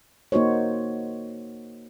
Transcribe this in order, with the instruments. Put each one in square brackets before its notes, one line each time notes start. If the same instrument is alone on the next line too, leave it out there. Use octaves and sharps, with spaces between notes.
[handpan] A#3 D#4 F#4 C5 C#5